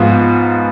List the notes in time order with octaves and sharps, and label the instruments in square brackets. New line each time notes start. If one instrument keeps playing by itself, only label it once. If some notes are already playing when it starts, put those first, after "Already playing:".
Already playing: [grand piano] G#2 F3 B3 F4